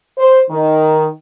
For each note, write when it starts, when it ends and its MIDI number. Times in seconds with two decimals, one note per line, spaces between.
0.18 0.40 72
0.51 1.08 51